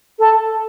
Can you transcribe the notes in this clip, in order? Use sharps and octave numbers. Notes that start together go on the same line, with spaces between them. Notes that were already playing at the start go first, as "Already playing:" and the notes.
A4